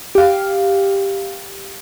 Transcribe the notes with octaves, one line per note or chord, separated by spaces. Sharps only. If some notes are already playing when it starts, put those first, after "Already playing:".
G4 F5